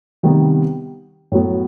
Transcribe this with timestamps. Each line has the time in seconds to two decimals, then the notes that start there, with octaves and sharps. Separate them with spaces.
0.23 C3 D#3 G3 B3
1.32 A2 F#3 B3